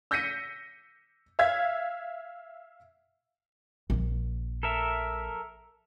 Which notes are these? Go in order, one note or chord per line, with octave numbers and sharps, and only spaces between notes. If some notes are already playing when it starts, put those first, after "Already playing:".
E6 G6 A#6 B6 C#7 D#7
E5 F5 E6 G#6 B6
A#1 F3
A4 A#4 E5